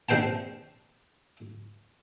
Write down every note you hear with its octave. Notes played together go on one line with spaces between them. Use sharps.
A#1 C3 C5 G5 A5